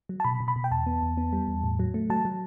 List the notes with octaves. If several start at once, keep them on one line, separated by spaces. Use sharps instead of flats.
F#3
A5
B2 B5
B2
B5
B2
G5
E2 A5
B3
E2
B3
G3
E2
A2
F#3
A3
F#3 A5
F#3